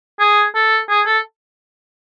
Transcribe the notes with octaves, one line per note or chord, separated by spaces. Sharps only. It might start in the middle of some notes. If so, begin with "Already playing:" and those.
G#4
A4
G#4
A4